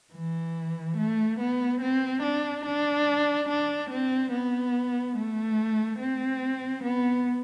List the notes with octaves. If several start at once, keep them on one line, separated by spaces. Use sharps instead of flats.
E3
A3
B3
C4
D4
D4
D4
C4
B3
A3
C4
B3